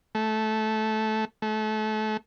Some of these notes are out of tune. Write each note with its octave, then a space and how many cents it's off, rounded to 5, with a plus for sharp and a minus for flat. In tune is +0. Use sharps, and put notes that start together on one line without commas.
A3 -15
A3 -30